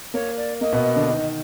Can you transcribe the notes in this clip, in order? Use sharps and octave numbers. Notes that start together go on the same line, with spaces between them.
A#3 C#5
D5
A#3 D#5
B2 B3
D3 D4
D#3 D#4